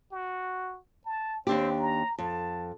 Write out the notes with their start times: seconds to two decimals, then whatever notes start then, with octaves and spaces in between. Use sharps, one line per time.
0.12 F#4
1.05 A5
1.47 D#2 C4 D4 G4
1.79 A#5
2.18 F2 A5